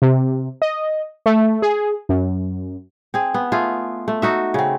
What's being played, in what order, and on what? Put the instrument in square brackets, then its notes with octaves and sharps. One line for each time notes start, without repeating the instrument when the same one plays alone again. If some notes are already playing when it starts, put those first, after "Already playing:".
[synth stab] C3
D#5
A3
G#4
F#2
[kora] C4 G#4
B3
A3 F4 G#4
A3
D#4 F#4 E5
C#3 C4